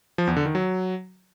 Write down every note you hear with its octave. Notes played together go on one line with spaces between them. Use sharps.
F3
E2
D3
D#3
F#3